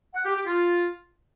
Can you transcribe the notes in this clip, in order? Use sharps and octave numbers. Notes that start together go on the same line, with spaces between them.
F#5
G4
G4
F4